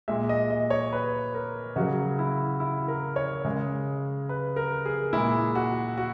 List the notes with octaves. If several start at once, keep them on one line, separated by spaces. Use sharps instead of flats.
A#2 G#3 E5
D#5
D#5
C#5
B4
A#4
C#3 F#3 F#4
E4
E4
A#4
C#5
C#3 G#3
B4
A#4
G#4
A#2 G#3 E4
F#4
F#4